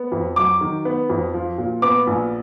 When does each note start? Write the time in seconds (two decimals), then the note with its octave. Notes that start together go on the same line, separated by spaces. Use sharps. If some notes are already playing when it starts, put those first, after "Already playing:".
Already playing: B3
0.12 F2
0.36 F#3 D6
0.61 D#3
0.85 B3
1.10 F2
1.34 F3
1.58 A#2
1.82 B3 D6
2.07 A#1